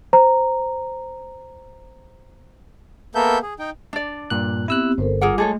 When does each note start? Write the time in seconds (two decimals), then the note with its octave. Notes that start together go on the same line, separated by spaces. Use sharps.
0.13 C5 A#5
3.15 A#3 B3 A4 A#4 E5 G6
3.42 G#4
3.59 D#4 G5
3.93 D4 D5
4.30 G2 A#2 F#6
4.68 B3 C4 E4 G4 E6 F#6
4.98 G1 A4 A#4 C5
5.21 G3 F4 G#4 A#4 F#5 D6
5.38 G#3 A3 G#4 A4 C#5